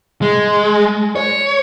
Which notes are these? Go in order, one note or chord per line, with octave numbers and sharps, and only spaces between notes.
G#3
C#5